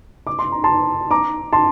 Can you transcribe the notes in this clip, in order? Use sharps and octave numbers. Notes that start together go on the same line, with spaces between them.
D6
C6
A#5
A5 C6
A#5 D6
A5 C6